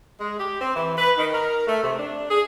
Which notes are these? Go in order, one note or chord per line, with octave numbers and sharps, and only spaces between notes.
G#3
G4
C4
E3
B4
D#3
A#4
A3
C3
D4
G#4